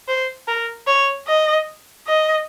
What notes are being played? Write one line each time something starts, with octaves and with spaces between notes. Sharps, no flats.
C5
A#4
C#5
D#5
D#5